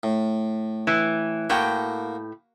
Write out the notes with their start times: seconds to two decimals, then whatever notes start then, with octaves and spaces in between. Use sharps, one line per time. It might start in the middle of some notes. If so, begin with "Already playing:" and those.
0.03 A2
0.87 E3
1.50 A2 A#3 F#4 G5